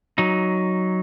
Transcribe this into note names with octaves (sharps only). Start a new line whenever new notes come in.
F#3 D#4